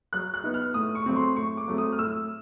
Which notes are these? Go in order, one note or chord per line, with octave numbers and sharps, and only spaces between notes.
F#3 F#6
F#6
B3 D#4
F6
A2 D#6
C#6
F#3 A3 C4
C6
A2 C#6
D6
F#3 A3 C4
D#6
F6
A2 E6